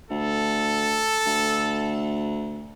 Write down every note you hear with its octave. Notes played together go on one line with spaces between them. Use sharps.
D2 A4
D2